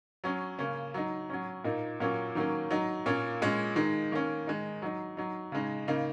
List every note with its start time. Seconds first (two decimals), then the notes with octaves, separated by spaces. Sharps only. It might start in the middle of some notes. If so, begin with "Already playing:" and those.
0.24 F#3 C#4
0.59 C#3 A#3 C#4
0.94 F#3 D#4
1.30 F#3 C#4
1.64 A#2 A#3 D#4
2.00 A#2 F#3 A#3 C#4
2.35 D#3 F#3 A#3 C#4
2.70 F#3 D#4
3.06 A#2 A#3 C#4
3.42 A#2 G#3 C#4
3.76 D#3 G#3 D#4
4.12 D#3 A#3 C#4
4.47 D#3 G#3 D#4
4.82 F#3 D#4
5.17 F#3 D#4
5.52 C#3 G#3 D#4
5.88 C#3 A#3 D#4